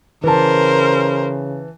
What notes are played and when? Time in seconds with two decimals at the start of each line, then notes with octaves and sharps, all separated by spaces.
0.24 C#3 E3 A#4 C5 A5